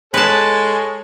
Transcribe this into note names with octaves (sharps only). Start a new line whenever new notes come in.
G#3 A4 B4 C#5 A5